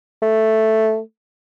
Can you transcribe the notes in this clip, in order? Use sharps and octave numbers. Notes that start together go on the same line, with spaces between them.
A3